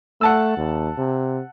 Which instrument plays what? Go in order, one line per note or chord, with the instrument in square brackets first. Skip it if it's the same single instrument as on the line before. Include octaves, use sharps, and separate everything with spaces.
[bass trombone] A3 [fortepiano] F#5 A5 E6
[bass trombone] D#2
C3